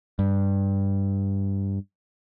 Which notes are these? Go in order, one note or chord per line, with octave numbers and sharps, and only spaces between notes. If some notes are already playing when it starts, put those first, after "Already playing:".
G2